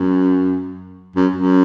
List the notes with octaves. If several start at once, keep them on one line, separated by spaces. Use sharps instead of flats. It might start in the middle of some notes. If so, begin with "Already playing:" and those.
Already playing: F#2
F#2
F#2